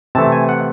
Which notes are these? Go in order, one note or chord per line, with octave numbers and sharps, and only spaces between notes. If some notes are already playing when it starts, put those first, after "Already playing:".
C3 E3 A3 A5
G#5
F#5